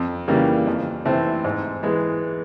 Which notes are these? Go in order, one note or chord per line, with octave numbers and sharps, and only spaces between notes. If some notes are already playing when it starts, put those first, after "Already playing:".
Already playing: F2
C#3 E3 G3 A#3
F2
C3 E3 A3 C4
G#2
E3 G#3 B3